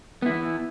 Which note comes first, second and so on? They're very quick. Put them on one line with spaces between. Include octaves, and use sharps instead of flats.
B3 E4 E3